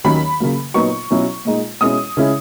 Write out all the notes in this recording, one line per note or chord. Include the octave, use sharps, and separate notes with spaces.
D#2 D#3 F#3 A#3 C#4 B5
C#3 F#3 A#3
A#2 F#3 B3 D#4 C#6
B2 F#3 C#4 E4
A#2 G#3 D#4
B2 G#3 C#4 E4 D#6
C#3 G#3 C#4 E4